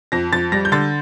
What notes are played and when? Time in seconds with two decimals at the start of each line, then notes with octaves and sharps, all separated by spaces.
0.12 F2 A#6
0.33 F2 A6
0.52 G3 A#6
0.65 G6
0.72 D3 A6